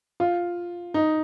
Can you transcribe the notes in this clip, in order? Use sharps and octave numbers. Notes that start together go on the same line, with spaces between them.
F4
D#4